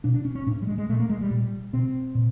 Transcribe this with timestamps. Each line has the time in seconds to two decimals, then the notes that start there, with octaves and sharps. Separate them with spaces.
0.04 B2 D4
0.14 D4
0.25 C#4
0.35 C#4
0.46 A2 D4
0.62 G3
0.67 G#3
0.78 G#3
0.89 A#2 A3
1.00 A#3
1.09 G#3
1.21 G3
1.31 A#2
1.73 B2 C4
2.15 A#2